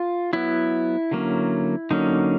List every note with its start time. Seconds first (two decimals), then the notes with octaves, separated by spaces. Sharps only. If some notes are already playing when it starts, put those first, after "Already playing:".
Already playing: F4
0.33 F#3 B3 E4
1.11 D3 F#3 A#3 C#4
1.91 D3 F#3 A#3 C#4 D#4